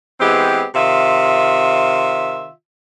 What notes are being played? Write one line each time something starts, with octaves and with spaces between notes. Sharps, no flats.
E3 G#3 B3 C4 G4
C3 D#3 F4 E5